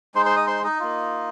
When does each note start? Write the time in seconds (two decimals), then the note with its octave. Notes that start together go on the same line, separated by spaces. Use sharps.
0.15 G#3 D#4 C5 C6
0.26 C5 C6
0.36 D#5 D#6
0.47 C5 C6
0.64 D#4 D#5
0.80 A#3 F4